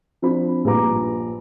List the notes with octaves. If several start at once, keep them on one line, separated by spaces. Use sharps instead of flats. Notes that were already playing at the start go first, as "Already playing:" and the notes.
F3 C4 D4 B5
A#1 G2 B4 A#5 D6